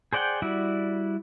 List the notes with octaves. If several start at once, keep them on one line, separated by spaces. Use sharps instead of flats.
G#4 C5 D5 F#5 G5
G3 E4 F#4 D5